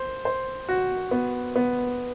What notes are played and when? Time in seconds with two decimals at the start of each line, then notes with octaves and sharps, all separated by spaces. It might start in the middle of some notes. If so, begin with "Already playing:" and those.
Already playing: C5
0.25 C5
0.69 F#4
1.11 B3
1.56 B3